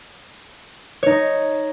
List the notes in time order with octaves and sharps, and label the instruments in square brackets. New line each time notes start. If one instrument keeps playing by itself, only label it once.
[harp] D#4 C#5